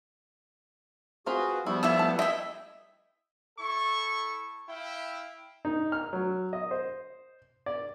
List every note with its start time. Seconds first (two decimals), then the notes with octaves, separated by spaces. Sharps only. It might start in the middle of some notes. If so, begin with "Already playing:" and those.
1.26 C4 F4 F#4 G#4 B4
1.66 F3 G3 B3 E4 F#4
1.83 E4 A4 D5 E5
1.98 A3 A5
2.19 E4 D#5 E5 G5
3.58 E4 A4 C#6
4.69 E4 E5 F5 G5
5.65 D#4
5.92 F6
6.13 F#3
6.53 D#5
6.71 C5
7.66 D5